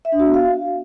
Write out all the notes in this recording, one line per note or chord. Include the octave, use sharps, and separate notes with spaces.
E5
D4
F#4
B3
F5